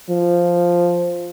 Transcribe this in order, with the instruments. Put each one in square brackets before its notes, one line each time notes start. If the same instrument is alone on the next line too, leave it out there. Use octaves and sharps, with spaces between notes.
[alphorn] F3